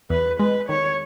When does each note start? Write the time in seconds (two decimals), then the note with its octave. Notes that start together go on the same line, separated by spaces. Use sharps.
0.10 E2 B4
0.39 G#3 B4
0.69 D#3 C#5